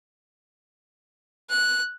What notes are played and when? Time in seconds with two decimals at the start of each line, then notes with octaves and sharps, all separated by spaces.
1.50 F#6